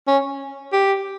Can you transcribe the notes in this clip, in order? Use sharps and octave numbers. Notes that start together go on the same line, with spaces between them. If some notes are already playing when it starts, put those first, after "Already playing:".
C#4
G4